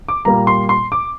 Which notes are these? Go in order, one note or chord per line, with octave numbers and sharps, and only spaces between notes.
D6
A#2 G3 A#3 A#5
C6
C6
D6